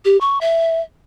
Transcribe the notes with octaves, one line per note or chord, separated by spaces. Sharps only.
G4
C#6
E5